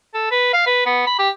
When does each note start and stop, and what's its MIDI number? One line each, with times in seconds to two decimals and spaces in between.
0.14 0.28 69
0.31 0.50 71
0.53 0.64 77
0.67 0.85 71
0.86 1.04 59
1.07 1.17 83
1.19 1.29 67